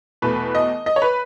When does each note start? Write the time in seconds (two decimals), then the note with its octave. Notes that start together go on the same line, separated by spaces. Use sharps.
0.22 E2 B2 A3 B4
0.55 D#5
0.86 D#5
0.96 C#5
1.02 B4